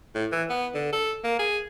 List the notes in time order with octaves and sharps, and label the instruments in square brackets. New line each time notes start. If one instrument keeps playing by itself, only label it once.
[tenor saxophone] A2
E3
B3
D3
A4
A#3
G#4